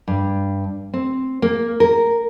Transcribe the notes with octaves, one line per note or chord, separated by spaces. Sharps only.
G2
C4
A#3
A#4